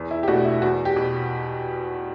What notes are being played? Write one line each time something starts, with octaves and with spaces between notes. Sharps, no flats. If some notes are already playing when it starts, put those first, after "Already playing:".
Already playing: E2
E4
G4
B2 A3 D4 F#4
E4
E2 F#4
G4
B2